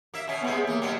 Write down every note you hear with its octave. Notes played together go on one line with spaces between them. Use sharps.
A#3 E5
B2 C#4
A2 C3 G#3 B3
G#4
E3 A#3
B2 F#3 G3